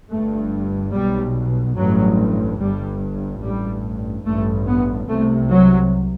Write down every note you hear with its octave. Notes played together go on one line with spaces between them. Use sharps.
G1 G2 A3
B1 B2 G3
A1 G2 F#3
G1 G2 G3
A1 G2 G3
A1 G2 A3
B3
C2 C3 A3
F#3